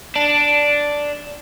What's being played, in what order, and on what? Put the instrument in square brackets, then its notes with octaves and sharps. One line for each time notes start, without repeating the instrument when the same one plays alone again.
[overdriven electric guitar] D4